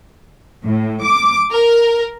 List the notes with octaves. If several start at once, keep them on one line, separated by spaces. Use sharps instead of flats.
A2
D6
A#4